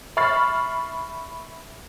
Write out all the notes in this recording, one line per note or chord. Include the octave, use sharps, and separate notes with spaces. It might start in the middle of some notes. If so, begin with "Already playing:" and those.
E5 B5 C#6 F6 A6 C7